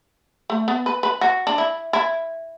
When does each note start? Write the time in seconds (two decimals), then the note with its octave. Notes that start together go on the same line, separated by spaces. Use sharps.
0.50 A3
0.68 B3
0.86 B4
1.03 B4
1.21 F#4
1.47 D4
1.58 E4
1.93 E4